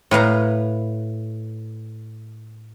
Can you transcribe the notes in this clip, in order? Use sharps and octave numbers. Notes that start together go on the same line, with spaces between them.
A2 B4 F5 A#5